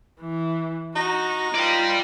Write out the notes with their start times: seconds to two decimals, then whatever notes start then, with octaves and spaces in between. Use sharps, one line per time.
0.21 E3
0.96 D#4 F#4 A#6
1.55 F4 B4 D5 G5